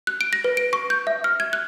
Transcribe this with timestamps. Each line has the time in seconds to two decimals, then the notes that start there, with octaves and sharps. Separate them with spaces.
0.07 F#6
0.21 D7
0.33 A#6
0.44 B4
0.57 D7
0.73 C#6
0.90 G6
1.07 E5
1.24 F6
1.40 G#6
1.53 F#6